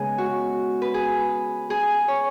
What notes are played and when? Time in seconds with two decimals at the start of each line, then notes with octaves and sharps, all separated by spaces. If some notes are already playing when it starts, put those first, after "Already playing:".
Already playing: C#3 G#3 B3 G#4
0.18 F#4
0.82 B4
0.94 G#4
1.70 G#4
2.08 C#5